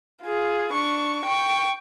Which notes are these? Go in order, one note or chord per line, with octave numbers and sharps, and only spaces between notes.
F4 G#4
D4 C#6
G5 C#6